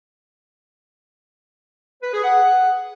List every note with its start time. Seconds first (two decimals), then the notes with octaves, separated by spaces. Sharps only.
2.03 B4
2.13 G#4
2.24 F#5